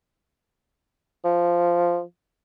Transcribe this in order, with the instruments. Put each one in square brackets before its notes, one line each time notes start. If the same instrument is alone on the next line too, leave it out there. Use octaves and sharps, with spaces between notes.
[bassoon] F3